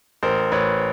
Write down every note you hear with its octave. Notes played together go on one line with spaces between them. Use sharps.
A1 A#4 C5
A1 B4 C#5